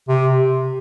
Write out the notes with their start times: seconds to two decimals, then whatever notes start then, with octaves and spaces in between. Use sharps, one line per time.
0.08 C3